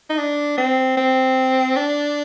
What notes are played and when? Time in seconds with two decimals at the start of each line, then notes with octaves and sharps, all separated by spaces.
0.10 D#4
0.18 D4
0.58 C4
0.97 C4
1.76 D4